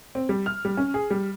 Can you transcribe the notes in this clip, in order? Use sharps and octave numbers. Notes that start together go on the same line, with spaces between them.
C4
G3
F6
G3
C#4
G#4
G3